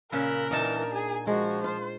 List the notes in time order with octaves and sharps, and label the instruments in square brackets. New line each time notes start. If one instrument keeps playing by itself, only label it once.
[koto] A#2 C#3 [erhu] A#4 [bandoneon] B5 E6 F#6
[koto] A#2 D#4 A5 [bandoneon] E3 [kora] D4
[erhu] G#4 [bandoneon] G#5
[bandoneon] F3 [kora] G#3 [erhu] F#4
[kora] F4 [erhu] C5